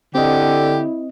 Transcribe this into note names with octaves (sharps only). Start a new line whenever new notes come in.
D3 C4 E4 G4 D#5